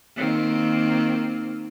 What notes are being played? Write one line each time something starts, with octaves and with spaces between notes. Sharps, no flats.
D#3 A#3 C4